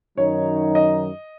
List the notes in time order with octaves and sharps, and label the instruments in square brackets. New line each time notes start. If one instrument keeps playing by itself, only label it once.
[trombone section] F#2 D#3 F#3 D#4 [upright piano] C#5
[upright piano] D#5